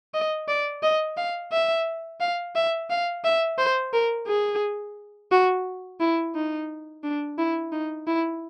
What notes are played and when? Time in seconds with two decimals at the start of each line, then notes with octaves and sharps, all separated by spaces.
0.14 D#5
0.49 D5
0.83 D#5
1.17 F5
1.52 E5
2.21 F5
2.56 E5
2.90 F5
3.25 E5
3.59 C5
3.93 A#4
4.27 G#4
5.32 F#4
6.01 E4
6.35 D#4
7.04 D4
7.38 E4
7.72 D#4
8.07 E4